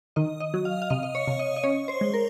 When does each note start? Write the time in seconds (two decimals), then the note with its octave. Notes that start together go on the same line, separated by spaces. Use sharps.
0.16 D#3 D#5
0.40 D#5
0.54 F#3
0.65 F5
0.82 F5
0.90 C3 D#5
1.03 D#5
1.15 C#5
1.27 C3
1.39 D#5
1.56 D#5
1.64 C#4 C#5
1.88 C5
2.01 G#3
2.14 A#4